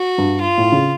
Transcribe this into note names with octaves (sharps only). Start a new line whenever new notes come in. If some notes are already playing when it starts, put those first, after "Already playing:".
Already playing: F#4
G2
F4
A2
C#3